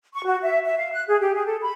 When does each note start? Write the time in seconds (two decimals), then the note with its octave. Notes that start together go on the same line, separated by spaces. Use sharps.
0.14 C#6
0.26 F#4
0.42 E5
0.65 E5
0.78 F5
0.93 F#6
1.08 G#4
1.20 G4
1.34 G#4
1.46 A4
1.62 B5